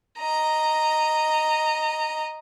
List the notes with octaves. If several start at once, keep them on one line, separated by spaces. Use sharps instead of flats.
D#5 A#5